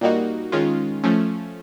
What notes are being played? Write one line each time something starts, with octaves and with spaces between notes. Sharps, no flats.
A#2 G3 A#3 D#4 F#4
D#3 G#3 C#4 F4
F3 A3 C#4